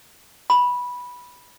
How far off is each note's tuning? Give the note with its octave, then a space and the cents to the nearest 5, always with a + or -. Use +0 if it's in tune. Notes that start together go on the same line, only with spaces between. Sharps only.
B5 -10